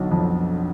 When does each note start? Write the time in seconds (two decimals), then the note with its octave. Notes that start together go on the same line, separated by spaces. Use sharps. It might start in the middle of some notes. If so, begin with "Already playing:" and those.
Already playing: B1 D3 F#3
0.11 F2